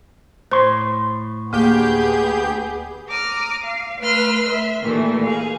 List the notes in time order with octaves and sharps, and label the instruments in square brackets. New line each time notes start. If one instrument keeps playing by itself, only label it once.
[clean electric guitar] A2 C6 [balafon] C5
[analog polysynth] D2 G4 G6 [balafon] A#3 [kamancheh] B3 G#4
[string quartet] A#5 D6 D#6 F6
F5
A3 B4 C6 E6 F6
E5
A#2 D#3 E3 G3 A3
G#4 F5